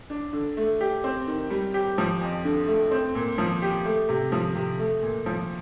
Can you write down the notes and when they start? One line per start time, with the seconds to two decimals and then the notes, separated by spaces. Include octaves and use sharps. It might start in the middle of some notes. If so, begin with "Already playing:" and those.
0.10 D4
0.33 D3
0.57 A3
0.81 G4
1.04 C4
1.27 D#3
1.50 G3
1.74 G4
1.98 F3
2.21 F2
2.45 D3
2.68 A3
2.91 C4
3.15 A#2
3.38 F3
3.62 G4
3.85 A3
4.09 C3
4.32 F3
4.56 C3
4.79 A3
5.03 A#2
5.26 F3